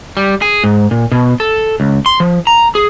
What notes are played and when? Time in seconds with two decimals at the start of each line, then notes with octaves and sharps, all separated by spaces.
0.17 G3
0.42 G#4
0.64 G#2
0.91 A#2
1.12 B2
1.40 A4
1.80 C#2
2.06 C6
2.20 F3
2.47 A#5
2.75 G#4